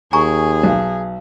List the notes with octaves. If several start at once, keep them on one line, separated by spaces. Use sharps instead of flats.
D#2 G#4 G#5 A#5 C#6
B1